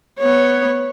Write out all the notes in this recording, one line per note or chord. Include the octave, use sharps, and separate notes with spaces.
B3 C#5